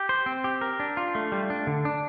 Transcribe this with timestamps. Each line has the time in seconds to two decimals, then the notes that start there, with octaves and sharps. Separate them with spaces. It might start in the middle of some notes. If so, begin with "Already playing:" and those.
Already playing: G4
0.09 C5
0.26 C4
0.44 G4
0.61 A#4
0.80 D4
0.97 F4
1.15 A3
1.32 G3
1.50 D4
1.67 D3
1.85 D4